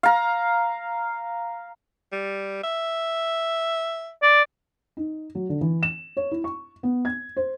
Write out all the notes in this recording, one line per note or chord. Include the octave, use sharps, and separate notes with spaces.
F5 A#5
G3
E5
D5
D#4
F#3
D3
E3
E7
C#5
E4
C#6
B3
G#6
C5